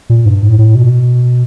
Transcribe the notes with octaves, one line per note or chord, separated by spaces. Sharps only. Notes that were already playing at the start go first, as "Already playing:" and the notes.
A#2
G2
A2
A2
B2